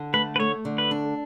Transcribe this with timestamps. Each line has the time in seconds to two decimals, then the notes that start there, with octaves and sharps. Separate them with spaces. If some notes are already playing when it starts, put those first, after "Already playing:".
Already playing: D3
0.14 A3 B4
0.36 B4
0.40 A3 C#5
0.65 D3
0.78 B4
0.91 D4